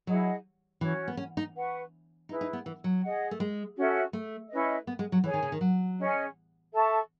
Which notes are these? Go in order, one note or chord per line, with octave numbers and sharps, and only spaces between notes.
F#3 E4 G#4 D#5 F#5
E3 C#4 F#4 C#5
B3
C#4
D#4
B4 F#5 C#6
D#4 E4 G#4 B4
D#4
B3
E3
F#3
G#4 D#5 F#5
A3
G#3
C#4 F#4 A4 E5
A3
C#4 E4 B4 D#5
B3
G#3
F#3
E3 G#4 C#5 G#5
D#3
C#3
D#3
F#3
C#4 G#4 D#5 G#5
A4 E5 A5 C#6